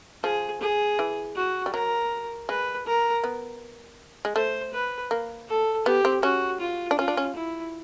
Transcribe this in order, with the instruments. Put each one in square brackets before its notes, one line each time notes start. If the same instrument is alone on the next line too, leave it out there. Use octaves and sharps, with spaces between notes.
[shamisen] F3 [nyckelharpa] G#4
[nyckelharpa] G#4
[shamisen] E3
[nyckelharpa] F#4
[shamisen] G3
[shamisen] F#3 [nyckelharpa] A#4
[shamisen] G#3 [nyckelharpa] B4
[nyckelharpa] A#4
[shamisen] B3
G#3
[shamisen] A3 [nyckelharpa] C5
[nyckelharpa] B4
[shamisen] A#3
[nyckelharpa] A4
[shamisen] B3 [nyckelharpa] G4
[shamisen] C4
[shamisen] C#4 [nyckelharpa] F#4
[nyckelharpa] F4
[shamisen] D4
[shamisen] C#4 [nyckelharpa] F4
[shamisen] D4
C#4
[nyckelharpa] E4